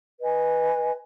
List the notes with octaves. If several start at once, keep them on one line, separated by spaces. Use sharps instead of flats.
B4 D#5 G#5